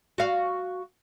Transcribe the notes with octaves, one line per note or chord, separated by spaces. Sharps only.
F#4 F5